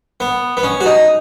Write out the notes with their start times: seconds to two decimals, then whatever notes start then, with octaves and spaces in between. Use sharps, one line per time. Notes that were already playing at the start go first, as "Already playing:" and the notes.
0.20 B3
0.57 B3
0.63 C#4
0.81 F#4
0.86 D#4